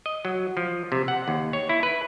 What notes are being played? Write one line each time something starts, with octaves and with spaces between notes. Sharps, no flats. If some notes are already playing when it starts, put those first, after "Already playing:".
D#5
F#3
F3
C3
F#5
D#2
C#5
E4
B4